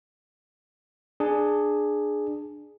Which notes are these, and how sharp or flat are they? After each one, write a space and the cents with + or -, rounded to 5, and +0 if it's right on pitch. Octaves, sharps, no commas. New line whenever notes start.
D4 +15 G#4 +5